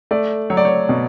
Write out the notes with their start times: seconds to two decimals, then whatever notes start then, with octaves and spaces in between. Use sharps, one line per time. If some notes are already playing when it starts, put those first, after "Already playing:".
0.11 A3 D5
0.50 F#3 C#5
0.57 D5
0.65 C#5
0.89 B2